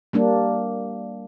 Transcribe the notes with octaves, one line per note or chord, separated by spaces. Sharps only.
G3 A#3 D4